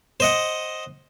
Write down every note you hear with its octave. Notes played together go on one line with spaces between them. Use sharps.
C5 D#5 F#5